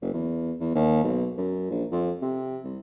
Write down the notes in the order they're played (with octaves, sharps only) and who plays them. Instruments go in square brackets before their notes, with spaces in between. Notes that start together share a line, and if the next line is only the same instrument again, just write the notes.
[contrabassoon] F#1
E2
E2
D#2
B1
F#2
A#1
F2
C3
C2